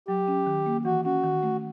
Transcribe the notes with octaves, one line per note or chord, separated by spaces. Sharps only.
F#3 G4
C#4
D#3
A#3
E3 F#4
C#4 F#4
D#3
A3